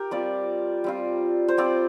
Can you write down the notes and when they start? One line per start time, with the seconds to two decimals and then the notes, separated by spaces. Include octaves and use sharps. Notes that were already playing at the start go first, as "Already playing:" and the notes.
Already playing: G4 A#4
0.11 G3 C4 F4 D5
0.84 G3 C4 F4
1.48 C5
1.57 G3 C4 F4 D5